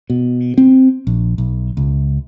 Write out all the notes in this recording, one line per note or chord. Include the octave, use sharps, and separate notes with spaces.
B2
C4
A#1
B1
C#2